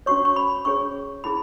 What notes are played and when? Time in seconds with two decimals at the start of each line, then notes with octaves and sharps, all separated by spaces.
0.06 C#4 F#4 C#5 C#6
0.25 C#6
0.36 B5
0.65 C#4 G#4 C#5 C#6
1.24 C#4 E4 G#4 B5